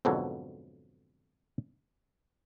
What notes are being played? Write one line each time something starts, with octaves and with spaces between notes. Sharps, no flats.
F2 G#2 B2 D3 F#3